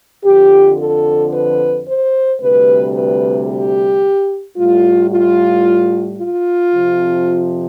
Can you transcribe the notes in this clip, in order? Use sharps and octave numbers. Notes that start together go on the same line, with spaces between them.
F2 D3 F3 G4
A4
B4
C5
D2 C3 G3 B4
B4
G4
A2 G3 F4
F4
F4
F2 C3 F3